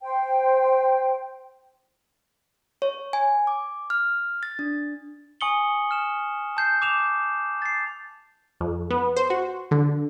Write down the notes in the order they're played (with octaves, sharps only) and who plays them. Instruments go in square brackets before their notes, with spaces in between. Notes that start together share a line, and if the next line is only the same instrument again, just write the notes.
[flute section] C5 G5
[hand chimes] C#5
G#5
D6
F6
A6
D4
[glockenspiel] G#5 C#6 D#6 C#7 F#7 G7
F6 E7
A5 G6 C7
D6 E7 F7
A6 C7
[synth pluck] F2
B3
C5
F#4
D3